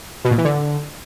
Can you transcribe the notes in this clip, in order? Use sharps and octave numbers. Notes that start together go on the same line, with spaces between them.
B2
A#2
E3
D3